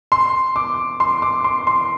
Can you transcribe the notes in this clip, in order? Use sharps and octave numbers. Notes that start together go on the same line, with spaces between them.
C6
D6
C6
D6
C6
C6